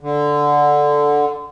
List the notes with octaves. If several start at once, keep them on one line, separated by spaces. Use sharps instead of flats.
D3